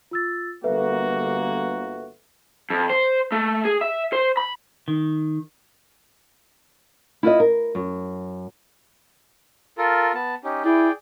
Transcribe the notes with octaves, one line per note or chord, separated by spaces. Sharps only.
F4 E6 A6
G1 A#3 F#4 A4 B4 E5
F2
C5
A3
G#4
E5
C5
B5
D#3
E4 F4 B4 D#5
A#4
F#2
F4 A4 A#4
B3 A5
C#4 D#4 G4
E4 G#4 D5 G5